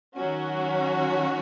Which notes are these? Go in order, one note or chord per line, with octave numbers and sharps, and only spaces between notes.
D#3 F#3 C#4 F#4